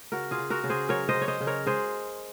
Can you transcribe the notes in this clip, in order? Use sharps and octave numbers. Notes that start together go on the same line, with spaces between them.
C#3 F#4 A#4
F4 G#4
C#3
F#4 A#4
C#3
G#4 C5
F#3 A#4 C#5
C5 D#5
C#3
C#5
C5 D#5
C#3
A#4 C#5
G#3 G#4 C5